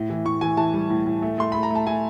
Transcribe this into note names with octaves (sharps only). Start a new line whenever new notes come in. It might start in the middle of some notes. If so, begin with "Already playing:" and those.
Already playing: A2
E3
A2 C#6
E3 G#5
E3 A5
G3
A2
A2
A3
A3 C6
A3 B5
A#5
A3 A5
A3 G#5